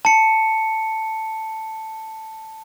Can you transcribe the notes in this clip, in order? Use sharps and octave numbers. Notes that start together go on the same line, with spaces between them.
A5 C#7